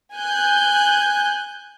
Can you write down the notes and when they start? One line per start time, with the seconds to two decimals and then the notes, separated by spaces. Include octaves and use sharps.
0.16 G#5 F#6 G6